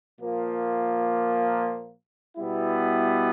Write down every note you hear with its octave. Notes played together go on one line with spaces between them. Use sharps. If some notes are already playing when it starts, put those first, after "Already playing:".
A#2 F3 A#3
B2 G3 B3 E4